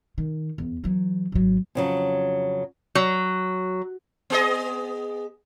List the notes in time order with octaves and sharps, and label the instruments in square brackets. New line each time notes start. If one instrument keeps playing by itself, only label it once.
[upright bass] D#3
E2
E3 F#3
G#1 F#3
[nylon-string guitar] F2 C#3 F#3
[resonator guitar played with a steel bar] F#3
[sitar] B3 G#4 D#5